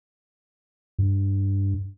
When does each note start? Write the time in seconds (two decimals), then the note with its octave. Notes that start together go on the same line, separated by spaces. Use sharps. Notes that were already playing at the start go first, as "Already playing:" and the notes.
0.99 G2